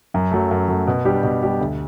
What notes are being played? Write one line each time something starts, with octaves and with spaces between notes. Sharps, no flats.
F#2
F#3 A3
F#2
F#3 A3
B2
G3 D4 G4
B2
G3 D4 G4
D2